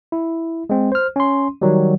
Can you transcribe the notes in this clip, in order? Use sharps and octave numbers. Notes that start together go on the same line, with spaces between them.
E4
G#3 C4
C5 F6
C#4 C6
D#3 F#3 G3